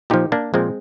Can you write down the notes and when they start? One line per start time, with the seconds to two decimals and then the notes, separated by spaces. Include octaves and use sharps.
0.10 A#2 F3 D#4 G4
0.32 A#3 D4
0.54 A#2 F3 G#3 C4